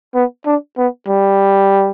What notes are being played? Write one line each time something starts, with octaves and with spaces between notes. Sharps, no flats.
B3
D4
B3
G3